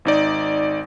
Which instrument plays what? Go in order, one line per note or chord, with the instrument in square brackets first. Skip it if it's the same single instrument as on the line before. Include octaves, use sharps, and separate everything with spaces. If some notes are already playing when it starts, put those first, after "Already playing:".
[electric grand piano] G#1 D#4 D5